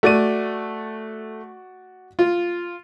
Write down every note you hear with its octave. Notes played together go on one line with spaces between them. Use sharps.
A3 F#4 D5 D#7
F4